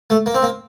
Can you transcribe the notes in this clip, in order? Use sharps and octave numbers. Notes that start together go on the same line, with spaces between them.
A3
A#3
C4
A#3